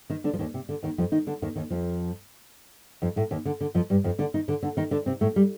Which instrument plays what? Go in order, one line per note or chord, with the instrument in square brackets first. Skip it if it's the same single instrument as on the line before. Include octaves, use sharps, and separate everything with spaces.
[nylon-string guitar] D#3 D#4
D3 D4
F3
D#2 D#3
C3
D3
D#2 D#3
F2 F3
D#3 D#4
D3 D4
D#2 D#3
D#2 D#3
F2 F3
F2 F3
A2 A3
D#2 D#3
D3
D3
F2 F3
G2 G3
F2 F3
D3 D4
D#3 D#4
D3 D4
D3 D4
D#3 D#4
D3 D4
C3 C4
A2 A3
G3